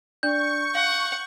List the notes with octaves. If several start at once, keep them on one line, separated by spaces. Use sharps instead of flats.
D4 D5 C#6 G6
F5 F#5